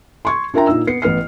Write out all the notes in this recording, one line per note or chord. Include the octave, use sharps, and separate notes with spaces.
C6 C#6 G#6
D4 F4 A#4 E5 G5 A#5
A#2 D#4 E6
B3 C7 C#7
A1 B3 F6 C7